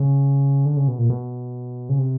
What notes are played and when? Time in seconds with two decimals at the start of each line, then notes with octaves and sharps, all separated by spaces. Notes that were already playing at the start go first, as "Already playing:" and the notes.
Already playing: C#3
0.66 D3
0.77 C#3
0.88 B2
0.99 A#2
1.10 B2
1.89 C#3
1.99 C3